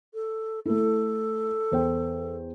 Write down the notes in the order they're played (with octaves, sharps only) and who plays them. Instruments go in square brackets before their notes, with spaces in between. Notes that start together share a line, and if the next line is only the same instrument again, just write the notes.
[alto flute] A4
[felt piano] A3 E4 [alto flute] A4
[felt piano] E2 C5 G5